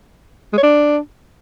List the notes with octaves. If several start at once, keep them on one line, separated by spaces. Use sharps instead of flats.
G#3
C#5
D4